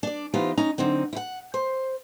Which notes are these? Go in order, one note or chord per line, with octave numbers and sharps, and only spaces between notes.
D4 D5
E3 B3 D#4 F4 G4 C5
C#4 D#4 A#5
D3 F#3 C4 D#4
E4 F#5
C5